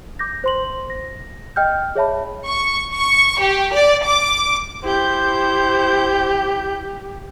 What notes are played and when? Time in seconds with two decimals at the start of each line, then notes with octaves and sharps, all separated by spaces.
0.19 D6 G6 A#6
0.44 C5 C6 F#7
0.90 A#6
1.56 D#5 G5 F6 G6
1.95 G#4 C#5 E5 A5 B5
2.47 C#6
2.94 C#6
3.41 G4
3.74 D5
4.05 D6
4.84 E4 G4 C5 G6